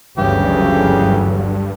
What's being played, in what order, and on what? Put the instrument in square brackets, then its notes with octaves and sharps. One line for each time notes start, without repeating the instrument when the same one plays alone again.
[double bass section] G1 D2 F#3 [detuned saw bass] G2 [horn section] C#3 E3 [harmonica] G4